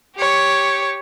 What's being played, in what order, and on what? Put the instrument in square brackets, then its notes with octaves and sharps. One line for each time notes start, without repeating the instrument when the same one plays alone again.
[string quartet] G4 C#5